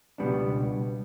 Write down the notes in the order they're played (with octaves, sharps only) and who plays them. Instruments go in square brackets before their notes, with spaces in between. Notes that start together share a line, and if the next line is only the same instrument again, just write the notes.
[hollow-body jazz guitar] C#2 B2 G3 B3 D4